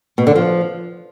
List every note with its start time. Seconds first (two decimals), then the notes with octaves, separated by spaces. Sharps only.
0.18 B2
0.27 D3
0.35 F3